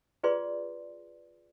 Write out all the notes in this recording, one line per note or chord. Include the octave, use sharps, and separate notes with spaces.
F4 G#4 B4 D5 C6